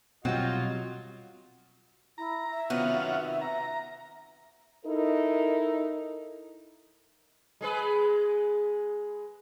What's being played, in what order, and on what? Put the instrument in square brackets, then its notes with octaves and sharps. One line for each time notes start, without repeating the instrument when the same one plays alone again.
[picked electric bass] B2 G3 [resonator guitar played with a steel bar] F#3 [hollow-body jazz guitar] C4 G5 [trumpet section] F4 D#5
[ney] E4 [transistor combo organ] A#5
[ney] E5
[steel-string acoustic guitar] C3 D#3 B3 [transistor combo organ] C#4 F4 F#4
[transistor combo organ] A#5
[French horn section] D#4 E4 A4 A#4
[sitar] G#3 G#4 B4